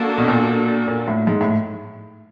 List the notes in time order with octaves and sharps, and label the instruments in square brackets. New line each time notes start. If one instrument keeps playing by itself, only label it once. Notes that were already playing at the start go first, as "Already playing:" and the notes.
Already playing: [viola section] A#3 D4 F#4 A4
[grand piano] B2
A#2
A#2
A2
G#2
A2